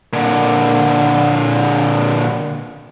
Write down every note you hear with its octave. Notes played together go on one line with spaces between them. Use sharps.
A#2 D3